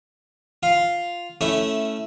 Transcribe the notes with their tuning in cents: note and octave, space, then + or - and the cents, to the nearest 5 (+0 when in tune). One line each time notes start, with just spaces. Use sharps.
F4 +0 F5 +0
A3 +0 C#4 +0 E4 -5